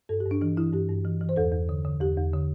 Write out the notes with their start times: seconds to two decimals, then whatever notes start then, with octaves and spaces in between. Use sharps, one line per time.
0.09 G2 A4
0.20 G4
0.26 G2
0.31 D4
0.41 E3 D4
0.57 E3 E4
0.73 G2 G4
0.89 G2
1.05 E3
1.21 E3
1.29 C5
1.36 E2 A4
1.52 E2
1.69 D3
1.84 D3
2.01 E2 G4
2.17 E2
2.33 D3